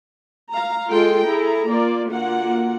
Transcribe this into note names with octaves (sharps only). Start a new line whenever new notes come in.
F5 A#5
G#3 F4 A4 G5 C6
E4 G#4 A4 A#5
A#3 F4 D5
D3 A#3 F4 F#4 F#5